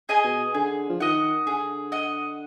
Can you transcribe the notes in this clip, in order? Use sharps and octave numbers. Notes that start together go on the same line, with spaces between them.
G#4 D#5 G#5
B2
D3 G#4
F3
D#3 D#5 F#5
D3 G#4
D#5 F#5